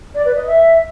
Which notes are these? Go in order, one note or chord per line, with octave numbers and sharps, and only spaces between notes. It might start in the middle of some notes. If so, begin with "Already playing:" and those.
D5
B4
D#5
E5